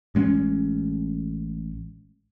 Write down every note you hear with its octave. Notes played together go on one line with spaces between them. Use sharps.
A1 G#3 C4 C#4